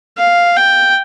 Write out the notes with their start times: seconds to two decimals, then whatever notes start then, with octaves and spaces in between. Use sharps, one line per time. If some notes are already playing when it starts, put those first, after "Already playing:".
0.18 F5
0.57 G5